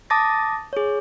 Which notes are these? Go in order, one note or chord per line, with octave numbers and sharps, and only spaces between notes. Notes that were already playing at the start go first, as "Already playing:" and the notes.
A5 D6 D#6 A6 A#6
G#4 C#5